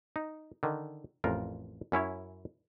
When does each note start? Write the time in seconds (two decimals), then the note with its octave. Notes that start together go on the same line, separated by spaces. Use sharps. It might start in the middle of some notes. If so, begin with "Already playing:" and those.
0.16 D#4
0.63 D3 D#3
1.24 A1 F2 F4 A#4
1.92 F#2 C#4 E4 C#5